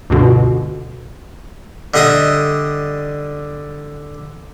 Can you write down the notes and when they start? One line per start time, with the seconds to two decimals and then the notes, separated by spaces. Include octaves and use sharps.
0.10 C#2 G2 B2 D3
1.94 D3 G3 D#5 E5 D#6